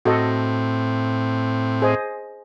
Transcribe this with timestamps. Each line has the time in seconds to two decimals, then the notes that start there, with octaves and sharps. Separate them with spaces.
0.05 A2 C4 F#4 A4 D#5
1.82 G#4 C5 D#5